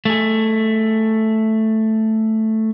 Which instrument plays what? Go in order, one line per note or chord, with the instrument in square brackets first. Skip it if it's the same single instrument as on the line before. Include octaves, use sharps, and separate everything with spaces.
[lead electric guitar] A3 G#4